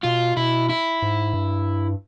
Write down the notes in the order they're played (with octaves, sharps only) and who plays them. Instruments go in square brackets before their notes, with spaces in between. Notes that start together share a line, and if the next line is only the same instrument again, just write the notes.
[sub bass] B2 [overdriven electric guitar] F4
[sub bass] B2 [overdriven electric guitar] E4
[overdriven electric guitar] E4
[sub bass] G#2
G2